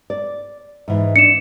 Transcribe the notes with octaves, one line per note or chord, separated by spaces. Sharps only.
D5
G#2 E3
D4 C#7 E7